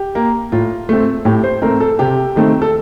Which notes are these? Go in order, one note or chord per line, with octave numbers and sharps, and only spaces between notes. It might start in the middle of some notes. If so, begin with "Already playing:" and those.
Already playing: G4
A#3
A2 F4
A3 C4
A2 G4
C5
A3 C4 A#4
A4
C3 G4
D#3 A3 C4
A4